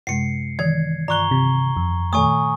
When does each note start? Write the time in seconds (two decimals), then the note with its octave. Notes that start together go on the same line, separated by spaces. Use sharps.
0.07 F#2 C3 G#3 C7 C#7
0.59 D#3 E3 G#6
1.08 G2 D5 A#5 C#6 F#6 G7
1.31 C3
1.77 F2
2.13 A#2 D#3 A3 G#5 C#6 D#6